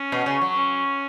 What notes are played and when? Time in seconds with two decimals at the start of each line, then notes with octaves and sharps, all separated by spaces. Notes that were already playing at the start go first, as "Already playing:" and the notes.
Already playing: C#4
0.12 B2
0.26 C#3
0.41 F#3
0.56 C#4